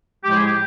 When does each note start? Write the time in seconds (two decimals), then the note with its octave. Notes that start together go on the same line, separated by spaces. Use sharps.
0.24 A2 F3 G#3 G4
0.35 G#4
0.46 G4